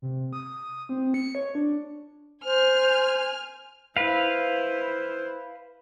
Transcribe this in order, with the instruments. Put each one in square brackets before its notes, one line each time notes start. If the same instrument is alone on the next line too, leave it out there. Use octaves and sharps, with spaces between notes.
[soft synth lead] C3
D#6
C4
C#7
C#5
D4
[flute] C5 [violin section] G#5 F6
[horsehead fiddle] E4 C5 [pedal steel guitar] B4 F5